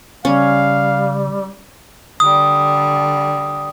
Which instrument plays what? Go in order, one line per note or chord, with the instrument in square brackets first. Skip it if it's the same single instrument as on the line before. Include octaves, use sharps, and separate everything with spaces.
[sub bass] C#3 [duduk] G3 [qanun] C#4 [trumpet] F5
[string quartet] D3 G3 [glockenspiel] D#6